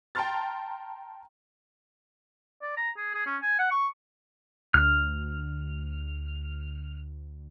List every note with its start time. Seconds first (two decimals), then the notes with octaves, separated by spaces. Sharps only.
0.15 G5 A5 A#5 C6 F6 A6
2.62 D5
2.77 A#5
2.97 G#4
3.14 G#4
3.26 C#4
3.42 G#5
3.59 F#5
3.71 C#6
4.74 D2 F6